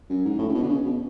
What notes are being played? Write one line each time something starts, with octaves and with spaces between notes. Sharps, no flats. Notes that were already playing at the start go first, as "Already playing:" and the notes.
F#2
G#2
A2
C#3
B2
D3
C#3
B2